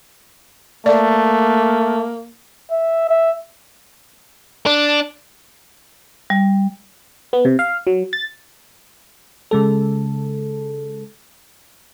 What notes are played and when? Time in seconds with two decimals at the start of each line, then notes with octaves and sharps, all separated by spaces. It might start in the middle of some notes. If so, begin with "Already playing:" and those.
0.86 A3 A#3 D5
2.71 E5
3.09 E5
4.66 D4
6.30 G3
7.33 B3
7.45 C3
7.59 F5
7.87 F#3
8.13 A6
9.51 C#3 G#3 A4